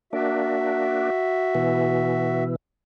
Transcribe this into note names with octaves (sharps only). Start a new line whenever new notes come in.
A#3 D4 F#4 E5
B2 E3